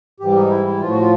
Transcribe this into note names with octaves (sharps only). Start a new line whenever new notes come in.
G#2 E3 G3 G4
D#4
E4
E4
A2 F3 F4
F#4
F4